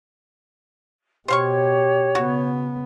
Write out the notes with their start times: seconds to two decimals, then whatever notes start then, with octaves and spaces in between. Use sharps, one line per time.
1.28 B2 G4 C5 C#5 F5 C#6
2.15 C#3 B3 F#4